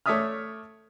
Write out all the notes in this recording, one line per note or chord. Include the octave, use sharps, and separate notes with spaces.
A3 C#5 D5 E5 D#6 F6